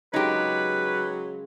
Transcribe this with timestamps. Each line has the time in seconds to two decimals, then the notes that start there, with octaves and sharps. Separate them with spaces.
0.14 C#3 F#3 G#3 D#4 G4 A#4 B4